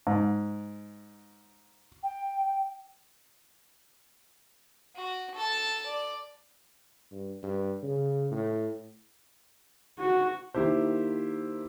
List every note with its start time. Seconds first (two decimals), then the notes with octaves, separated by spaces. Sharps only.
0.07 G#2
2.03 G5
4.96 F#4
5.35 A4 A5
5.86 D5
7.12 G2
7.43 G2
7.83 C#3
8.31 A2
9.99 F#4
10.54 D#3 A#3 E4 G4 C5